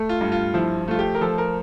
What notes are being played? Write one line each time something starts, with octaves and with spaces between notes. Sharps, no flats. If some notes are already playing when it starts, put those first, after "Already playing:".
Already playing: A3
F4
G2
F4
F3 E4
A3 F4
G4
A#4
F3 A4
A#4